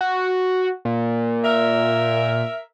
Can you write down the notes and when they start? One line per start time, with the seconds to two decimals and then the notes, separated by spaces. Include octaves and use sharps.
0.01 F#4
0.85 A#2
1.45 A#4 E5